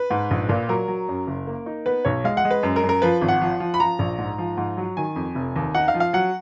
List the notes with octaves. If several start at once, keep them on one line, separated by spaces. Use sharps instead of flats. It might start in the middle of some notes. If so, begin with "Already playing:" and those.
Already playing: B4
G#2
A#1
A#2
F#3 A#4
F#3
F#2
F#1
A#3
D#4
B3 B4
B1 C#5
G#3 F5
F#5
G#3
B4
F#2
A#4
F#2
A#4
F3 B4
G#1
F#5
F3
F3
B5
F3 A#5
A#1
G#2
F3
G#2
F#3
D#3 G#5
F2
F1
D#2
D#4 F#5
F5
F3
F5
F#3 F#5